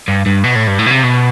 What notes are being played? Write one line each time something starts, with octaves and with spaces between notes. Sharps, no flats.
G2
G2
B2
A2
G2
A2
B2
C3
B2